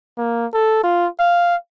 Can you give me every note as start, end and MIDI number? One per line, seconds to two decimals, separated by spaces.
0.18 0.46 58
0.54 0.80 69
0.84 1.07 65
1.19 1.55 77